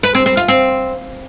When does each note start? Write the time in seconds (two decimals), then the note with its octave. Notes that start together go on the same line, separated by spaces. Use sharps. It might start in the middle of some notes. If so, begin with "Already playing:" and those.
0.03 B4
0.15 C4
0.26 C4
0.37 F4
0.48 C4